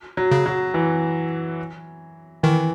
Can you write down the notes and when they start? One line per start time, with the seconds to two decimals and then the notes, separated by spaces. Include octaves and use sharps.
0.17 F#3
0.31 C#3
0.46 F#3
0.74 E3
2.43 D#3 E3